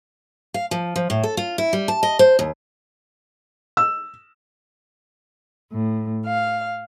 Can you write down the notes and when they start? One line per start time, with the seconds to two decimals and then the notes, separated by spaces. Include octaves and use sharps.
0.54 F5
0.71 F3
0.96 F3
1.10 A2
1.23 A4
1.37 F4
1.58 E4
1.73 G3
1.88 A5
2.03 D#5
2.19 C5
2.39 D#2
3.77 E6
5.70 A2
6.26 F5